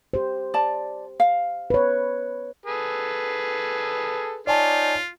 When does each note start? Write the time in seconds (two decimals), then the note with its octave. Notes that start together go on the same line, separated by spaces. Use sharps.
0.14 G4 C5
0.54 D5 A5
1.20 F5
1.70 B4 C#5
2.66 G#4 A4 B4
4.47 D#4 F4 C#5 D5 G#5 A5